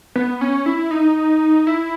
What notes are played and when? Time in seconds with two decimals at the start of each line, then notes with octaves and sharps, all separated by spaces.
0.16 B3
0.41 C#4
0.66 E4
0.91 D#4
1.67 E4